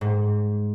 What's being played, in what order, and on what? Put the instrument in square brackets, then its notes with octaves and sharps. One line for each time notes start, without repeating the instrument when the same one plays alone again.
[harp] G#2